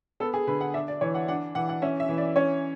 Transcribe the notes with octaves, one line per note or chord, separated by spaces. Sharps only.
B3 A4
G#4
D3 B4
F#5
D4 E5
D5
E3 C#5
F#5
D4 F#5
E3 F#5
F#5
C#4 E5
E5
E3
D5
C#4 C#5